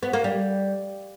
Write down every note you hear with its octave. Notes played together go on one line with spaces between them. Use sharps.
B3
A#3
G3